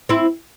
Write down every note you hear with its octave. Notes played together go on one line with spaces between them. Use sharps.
C4 E4